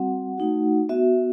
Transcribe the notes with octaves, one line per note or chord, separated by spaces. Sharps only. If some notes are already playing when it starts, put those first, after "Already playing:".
Already playing: G3 C4 F#4 F#5
A3 D#4 F#4
B3 F#4 E5